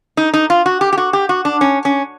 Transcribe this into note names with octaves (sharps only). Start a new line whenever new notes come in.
D#4
D#4
F4
F#4
G4
G4
F#4
G4
F#4
D4
C#4
C#4